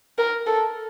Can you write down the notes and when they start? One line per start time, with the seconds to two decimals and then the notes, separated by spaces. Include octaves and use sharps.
0.18 A#4
0.47 A4